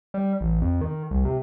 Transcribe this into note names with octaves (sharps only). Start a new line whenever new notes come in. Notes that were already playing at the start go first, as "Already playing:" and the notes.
G3
A1
F2
D#3
C2
C3